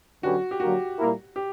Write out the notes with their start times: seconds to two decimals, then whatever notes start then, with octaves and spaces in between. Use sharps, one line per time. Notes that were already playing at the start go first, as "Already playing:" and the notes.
0.22 D3 F#3 C#4 F#4 G4 B4
0.51 G4
0.60 D3 F#3 A#3 F#4
0.98 A#2 G3 A#3 E4 A#4
1.36 G4